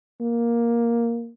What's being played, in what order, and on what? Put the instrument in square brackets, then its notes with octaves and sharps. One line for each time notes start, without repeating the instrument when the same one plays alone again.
[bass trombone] A#3